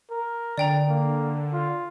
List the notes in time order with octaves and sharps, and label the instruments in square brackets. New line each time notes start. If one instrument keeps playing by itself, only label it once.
[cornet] A#4
[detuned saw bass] D3 [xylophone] D5 G5 A#5
[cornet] A#3
F4